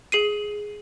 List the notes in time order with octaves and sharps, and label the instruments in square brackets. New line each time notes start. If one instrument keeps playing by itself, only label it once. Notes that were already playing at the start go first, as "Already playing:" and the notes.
[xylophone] G#4 C7 D#7